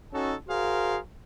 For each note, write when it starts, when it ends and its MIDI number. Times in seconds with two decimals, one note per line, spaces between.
0.12 0.34 61
0.12 0.34 63
0.12 0.34 66
0.12 0.34 69
0.48 0.97 66
0.48 0.97 68
0.48 0.97 70
0.48 0.97 72
0.48 0.97 77